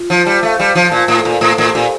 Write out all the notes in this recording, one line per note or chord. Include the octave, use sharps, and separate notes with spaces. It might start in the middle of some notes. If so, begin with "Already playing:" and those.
Already playing: F4
F3
C5
G3
A3 F5
G3
C5
F3
A#2 F4
A2
A4
A#2
A2 C5
A2
G4
A#2